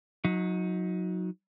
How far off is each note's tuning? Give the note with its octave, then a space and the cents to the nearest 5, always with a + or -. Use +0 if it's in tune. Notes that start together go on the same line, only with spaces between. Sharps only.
F#3 -20 D#4 +20